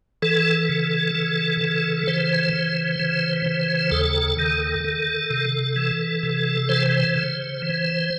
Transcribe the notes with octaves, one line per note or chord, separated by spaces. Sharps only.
E3 A4
C#3
E3
C#3
E3 C5
C#3
E3
C#3
D#2 A4
D#3
D#3
C3
E3
C3
E3 C5
C#3
E3